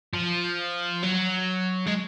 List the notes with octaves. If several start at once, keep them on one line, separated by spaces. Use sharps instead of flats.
F3
F#3
G#3